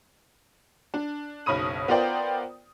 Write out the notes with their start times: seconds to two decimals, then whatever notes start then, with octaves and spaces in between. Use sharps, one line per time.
0.94 D4
1.46 F#1 B1 C#5 B5 D#6 D#7
1.88 B3 F4 A#4 C5 D5 G5